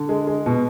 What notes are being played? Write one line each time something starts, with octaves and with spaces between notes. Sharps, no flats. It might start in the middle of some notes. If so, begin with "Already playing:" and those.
Already playing: D3
G#3
G#3
B2